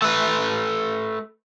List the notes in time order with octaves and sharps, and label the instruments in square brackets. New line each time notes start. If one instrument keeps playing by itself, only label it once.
[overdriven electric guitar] A3 B4